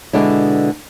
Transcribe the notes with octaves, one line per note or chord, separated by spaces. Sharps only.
B2 D3 G#3 D4 E4